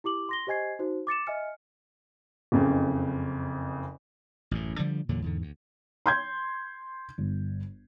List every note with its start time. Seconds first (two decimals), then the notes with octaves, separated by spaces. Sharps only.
0.04 E4 G4 D6 F#7
0.29 C6 A#6 G7
0.47 G4 C5 D#5 G#5 G#6 C7
0.79 D#4 F#4 C5
1.07 D6 A6 C#7 E7
1.27 D#5 E5 G#5 F6 C#7
2.52 F#1 F2 C#3
4.51 A1 F#2 A2
4.78 D3 F3 G3
5.09 E2 A#2 D3 F#3
5.22 E2 G#2 D3
5.42 D2
6.06 C6 G6 G#6
7.18 G1